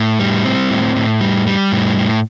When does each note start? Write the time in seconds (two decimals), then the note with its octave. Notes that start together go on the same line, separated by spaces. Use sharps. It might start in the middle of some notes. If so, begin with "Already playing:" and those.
Already playing: A2
0.20 G3
0.45 C4
0.70 A2
0.96 A2
1.21 G3
1.47 G3
1.72 A2
1.98 A2